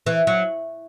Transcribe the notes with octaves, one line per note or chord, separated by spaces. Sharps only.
E3
F#3